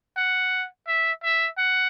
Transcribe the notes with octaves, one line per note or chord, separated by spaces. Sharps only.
F#5
E5
E5
F#5